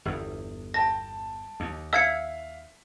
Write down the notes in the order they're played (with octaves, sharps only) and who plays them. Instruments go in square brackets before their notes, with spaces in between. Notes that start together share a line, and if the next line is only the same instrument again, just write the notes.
[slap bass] G1 E2
[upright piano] G5 A5 [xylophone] A#6
[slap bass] D#2
[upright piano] E5 F5 B6 [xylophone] E6 G#6 C#7